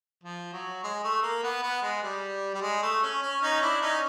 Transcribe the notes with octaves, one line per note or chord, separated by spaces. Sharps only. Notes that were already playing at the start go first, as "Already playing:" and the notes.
F3
F#3
G#3
A3
A#3
B3
B3
G#3
G3
G3
G#3
A3
C#4
C#4
C#4 D#4
D4 E4
C#4 D#4